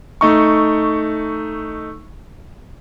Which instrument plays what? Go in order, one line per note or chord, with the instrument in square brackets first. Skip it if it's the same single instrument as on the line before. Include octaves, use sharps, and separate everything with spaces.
[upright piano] A3 D#4 C#6